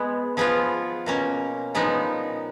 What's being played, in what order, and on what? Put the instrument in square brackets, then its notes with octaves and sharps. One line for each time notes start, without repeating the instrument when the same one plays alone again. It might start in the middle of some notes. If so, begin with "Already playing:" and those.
Already playing: [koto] G#3 B3 G#4
F3 B3 F4 G#4
B2 A#3 C#4
A#2 F3 G#3 B3 D#4